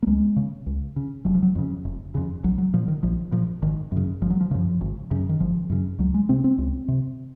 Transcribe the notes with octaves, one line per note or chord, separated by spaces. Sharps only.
A#3
C#2 G#3
C#3
C#2
C#3
F1 F#3
F3
F#3
F2 C#3
F1
F2 C#3
A#1 F#3
F#3
A#2 F3
D#3
A#1 F3
A#2 F3
G#1 D#3
F#2
C#3
G#1 F3
F#3
F3
F#2 C#3 F3
G#1
F#2 C#3
D#3
G#1 F3
F#2 C#3
C#2 F#3
G#3
C3 C4
C4
C#2
C3